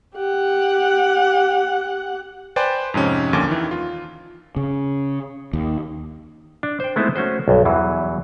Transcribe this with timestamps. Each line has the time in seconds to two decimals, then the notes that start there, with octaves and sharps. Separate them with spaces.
0.16 G4 F#5
2.56 B4 C5 D5 G5 G#5 B5
2.94 F2 G#2 C3 C#4
3.33 A#1 D#2 D3 C#4 D6
3.48 D#3 E3
3.71 F4
4.56 C#3
5.53 D#2
6.63 D4
6.80 C5 G5
6.96 G#3 A3 B3 C4 D#4 E4
7.16 A3 C#4 F#4 C5
7.48 B1 G2
7.65 E2 E3 F#3 G3